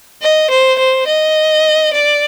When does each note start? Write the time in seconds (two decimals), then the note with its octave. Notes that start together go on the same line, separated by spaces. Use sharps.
0.22 D#5
0.50 C5
0.79 C5
1.07 D#5
1.93 D5